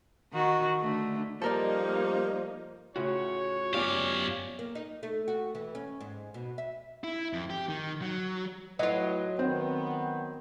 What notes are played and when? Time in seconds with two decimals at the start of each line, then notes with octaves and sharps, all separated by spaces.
0.33 D#3 F#4
0.79 D3 A3
1.42 F3 G3 A#3 D#4 A4 A#4 D5
2.96 A2 C#3 F4 F#4 C#5
3.74 F#2 B3 F4 G4 D5 F5 G#5 D6
4.59 A#3
4.75 D#4
5.03 A3
5.28 F#4
5.55 E3
5.75 C#4
6.01 G#2
6.34 B2
6.58 E5
7.04 E4
7.33 F2
7.50 G4
7.69 D#3
8.01 F#3
8.79 A2 F#3 F4 B4 D#5
9.39 D#3 B3 C4